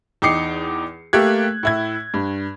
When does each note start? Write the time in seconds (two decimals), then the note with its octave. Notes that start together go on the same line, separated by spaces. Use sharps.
0.22 E2 D#4 G5 D6 C7 C#7
1.13 A3 A#3 G4 F#6 G#6
1.63 A2 E4 G#6
2.14 G2